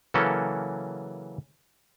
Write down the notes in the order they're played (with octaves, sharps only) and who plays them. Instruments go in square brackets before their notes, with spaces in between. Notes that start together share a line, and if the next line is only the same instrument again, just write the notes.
[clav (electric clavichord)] C#3 E3 F#3 A#3 C#4 A4